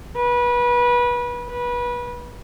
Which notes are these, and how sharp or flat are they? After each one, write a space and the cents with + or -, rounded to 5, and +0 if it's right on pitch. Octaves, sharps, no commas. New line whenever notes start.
B4 -25
B4 -25